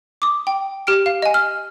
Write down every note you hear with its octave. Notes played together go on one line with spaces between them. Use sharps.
D6 D#6
G5
G4 F6 D7
F5
D#5 G#5
F6